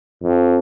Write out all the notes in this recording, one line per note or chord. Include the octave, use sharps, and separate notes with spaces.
F2